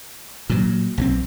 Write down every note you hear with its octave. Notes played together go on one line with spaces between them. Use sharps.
A#2 F#3
B1 F3 C4